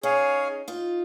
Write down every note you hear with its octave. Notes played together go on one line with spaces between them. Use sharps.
C#4 D#4 G#4 C#5 F5 G#5
D#4 F4